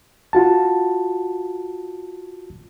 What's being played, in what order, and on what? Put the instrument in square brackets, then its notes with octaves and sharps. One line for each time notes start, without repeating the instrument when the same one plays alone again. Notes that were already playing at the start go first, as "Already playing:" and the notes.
[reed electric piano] F4 F#4 A5